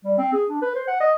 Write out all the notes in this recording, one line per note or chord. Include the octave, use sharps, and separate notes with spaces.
G3
C4
G#4
D4
B4
C5
F#5
D#5